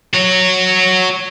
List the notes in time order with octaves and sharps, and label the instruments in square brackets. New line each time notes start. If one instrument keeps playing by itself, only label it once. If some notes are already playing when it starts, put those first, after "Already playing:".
[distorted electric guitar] F#4 C#5